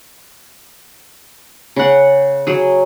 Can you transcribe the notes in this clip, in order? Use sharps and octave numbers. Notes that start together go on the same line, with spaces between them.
C#3 F#5
F#3 G#4